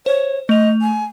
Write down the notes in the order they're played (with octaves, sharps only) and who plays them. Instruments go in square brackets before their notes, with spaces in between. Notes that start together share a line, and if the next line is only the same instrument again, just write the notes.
[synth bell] C5 [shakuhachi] C#5
[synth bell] A3 F7 [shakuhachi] D#5
[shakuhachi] G#5